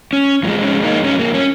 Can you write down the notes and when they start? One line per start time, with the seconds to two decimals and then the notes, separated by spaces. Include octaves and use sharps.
0.13 C#4
0.43 F2 F3 G#3 A#3
0.63 C#4
0.83 A#3 D#4
1.04 C#4
1.19 A#3
1.34 C#4